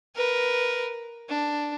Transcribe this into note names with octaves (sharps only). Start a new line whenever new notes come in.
A#4 B4
D4